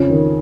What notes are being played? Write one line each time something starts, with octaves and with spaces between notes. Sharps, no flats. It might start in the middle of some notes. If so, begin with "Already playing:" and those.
Already playing: F2 C#3 C#5
D#3